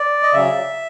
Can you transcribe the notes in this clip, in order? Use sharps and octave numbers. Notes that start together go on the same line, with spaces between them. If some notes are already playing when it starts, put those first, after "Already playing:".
Already playing: D5
D#5
C#3 F#3 E5